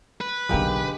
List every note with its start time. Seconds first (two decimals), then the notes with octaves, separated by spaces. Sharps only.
0.21 B4
0.49 B1 F2 D3 G#3 A#3 G4 G5